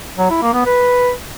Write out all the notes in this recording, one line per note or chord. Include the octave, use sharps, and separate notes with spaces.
F#3
E4
A#3
B3
B4